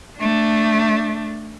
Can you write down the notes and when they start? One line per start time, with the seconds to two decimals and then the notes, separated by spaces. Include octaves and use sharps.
0.18 A3 D4